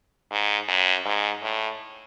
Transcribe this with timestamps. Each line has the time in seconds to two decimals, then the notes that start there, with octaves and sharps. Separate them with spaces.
0.31 G#2
0.68 F#2
1.05 G#2
1.42 A2